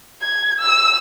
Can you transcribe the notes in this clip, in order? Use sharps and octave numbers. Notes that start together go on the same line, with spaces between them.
G#6
E6